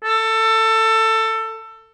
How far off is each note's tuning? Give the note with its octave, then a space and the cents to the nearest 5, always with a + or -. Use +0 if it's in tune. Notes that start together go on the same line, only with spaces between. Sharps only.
A4 +20